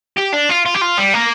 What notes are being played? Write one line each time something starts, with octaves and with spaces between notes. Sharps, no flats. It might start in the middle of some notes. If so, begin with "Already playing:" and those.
G4
D4
F4
F4
G4
F4
G3
A#3